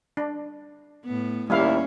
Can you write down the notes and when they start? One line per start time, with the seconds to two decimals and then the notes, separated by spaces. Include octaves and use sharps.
0.17 D4
1.06 A2 B3
1.50 D#2 G3 A#3 C#4 E4 F5